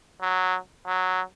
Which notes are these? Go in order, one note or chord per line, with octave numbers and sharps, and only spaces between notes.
F#3
F#3